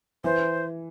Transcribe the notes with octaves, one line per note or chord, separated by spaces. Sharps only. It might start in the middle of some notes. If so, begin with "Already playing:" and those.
E3 C5